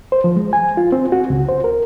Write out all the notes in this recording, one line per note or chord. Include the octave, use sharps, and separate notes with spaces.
C5
F3
G#3
G#5
F4
C4
F#4
C#2
C5
A#4